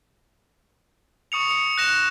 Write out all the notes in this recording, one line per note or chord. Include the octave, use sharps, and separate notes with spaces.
C#6 D#6 C#7 F7
C#7 F7
F#6 A#6 E7